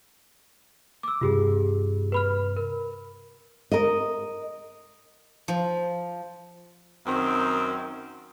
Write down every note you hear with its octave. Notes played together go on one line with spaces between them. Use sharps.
D6 E6
G2 C3 F4 G4 G#4
B4 B5 F6
A#4
A#4 D#5
F3
F#2 D#3 C4